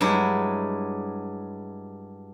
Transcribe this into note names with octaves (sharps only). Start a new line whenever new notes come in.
G2 F#3 G#3 E4